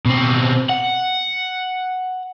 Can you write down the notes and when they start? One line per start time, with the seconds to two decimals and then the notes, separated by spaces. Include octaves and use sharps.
0.05 B2 C4
0.69 F#5